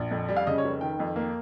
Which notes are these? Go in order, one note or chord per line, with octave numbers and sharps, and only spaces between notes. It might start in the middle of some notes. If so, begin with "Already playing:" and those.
Already playing: A#1
F2
G3
F5
C#3 D#5
C#5
F1
D#3 G5
F2
A#3